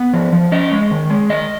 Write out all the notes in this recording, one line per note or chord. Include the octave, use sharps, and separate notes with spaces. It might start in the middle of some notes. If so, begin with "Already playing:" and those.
Already playing: B3
F3
F3
C#4 D#5
G#3
D#3
G#3
D#3 D#5